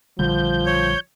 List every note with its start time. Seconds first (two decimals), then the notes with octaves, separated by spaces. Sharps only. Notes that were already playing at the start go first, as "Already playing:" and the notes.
0.19 A#1 D3 F3 G3 G6
0.66 C#5